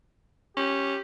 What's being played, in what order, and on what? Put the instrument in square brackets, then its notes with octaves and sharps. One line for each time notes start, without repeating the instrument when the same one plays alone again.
[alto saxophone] C#4 [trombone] G4